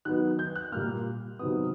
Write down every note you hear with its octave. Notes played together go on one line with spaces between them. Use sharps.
D#3 F#3 B3 F#6
G6
F#6
A#2 G3 A#3 F6
C3 D#3 F#3 B3 D#6